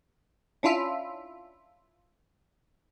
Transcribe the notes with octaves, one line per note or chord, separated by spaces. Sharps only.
C#4 D4 E4 F4 E5